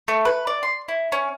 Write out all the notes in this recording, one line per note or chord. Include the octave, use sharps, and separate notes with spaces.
A3
B4
D5
C6
E4
C#4